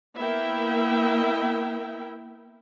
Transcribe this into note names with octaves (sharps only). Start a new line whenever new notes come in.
A#3 B3 E4 A#4 E5 G5